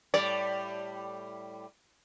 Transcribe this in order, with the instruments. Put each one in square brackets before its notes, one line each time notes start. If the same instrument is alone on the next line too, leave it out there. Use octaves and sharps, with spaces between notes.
[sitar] A2 G3 [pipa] D5